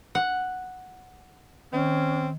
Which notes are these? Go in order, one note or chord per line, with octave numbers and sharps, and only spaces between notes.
F#5
D#3 C4 C#4